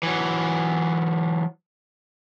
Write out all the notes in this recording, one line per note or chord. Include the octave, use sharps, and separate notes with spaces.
E3 F#3